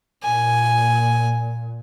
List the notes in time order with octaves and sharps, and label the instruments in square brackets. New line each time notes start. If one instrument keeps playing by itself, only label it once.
[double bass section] A#2 [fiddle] G#5